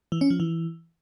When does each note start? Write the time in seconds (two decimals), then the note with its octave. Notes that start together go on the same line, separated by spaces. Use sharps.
0.12 E3
0.21 C#4
0.30 F3
0.40 E3